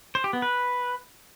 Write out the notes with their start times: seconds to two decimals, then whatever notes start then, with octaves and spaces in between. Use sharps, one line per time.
0.15 C5
0.24 G4
0.33 B3
0.42 B4